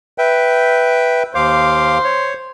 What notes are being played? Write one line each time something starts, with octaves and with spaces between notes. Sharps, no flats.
B4 E5 G5
D#2 C5 F5 D6
C#5